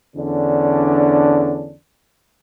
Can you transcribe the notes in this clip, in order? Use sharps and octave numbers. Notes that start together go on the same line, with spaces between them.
E2 D3 C#4 D4